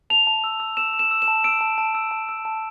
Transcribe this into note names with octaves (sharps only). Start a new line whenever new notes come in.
A5 F7
A5
E6
E6
E6 E7
E6
E7
E6
E7
A5
E6 D7
A5
A5
E6
A5
E6
A5